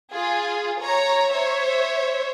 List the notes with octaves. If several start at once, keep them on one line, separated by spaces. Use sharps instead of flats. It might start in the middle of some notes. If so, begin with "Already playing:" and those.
F4 G#4
C#5 A#5
C5 C#5 E5